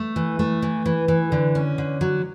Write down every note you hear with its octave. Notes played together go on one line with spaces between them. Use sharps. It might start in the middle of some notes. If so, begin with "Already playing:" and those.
Already playing: A3
E3
A3
E3
E3
E3
D3
C#4
D3
F#3